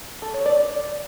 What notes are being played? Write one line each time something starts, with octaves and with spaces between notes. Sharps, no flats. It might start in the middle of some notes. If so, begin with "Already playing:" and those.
A4
C#5
D5